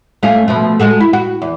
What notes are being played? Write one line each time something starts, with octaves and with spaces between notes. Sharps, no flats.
A3 C#4 F4
B2 F3 A3
G#3 F#4 A4
E4
F#4
E2